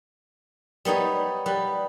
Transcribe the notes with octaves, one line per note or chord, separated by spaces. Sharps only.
G3 B3 D#4 C#5
G3 B4